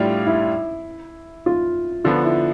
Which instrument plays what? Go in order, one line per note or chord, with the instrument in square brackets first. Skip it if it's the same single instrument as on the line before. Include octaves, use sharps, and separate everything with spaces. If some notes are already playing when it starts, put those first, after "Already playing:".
Already playing: [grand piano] A2 G3 D4 F4 [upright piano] E4
[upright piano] E4
F4
[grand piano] D3 F3 B3 [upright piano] F4
[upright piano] E4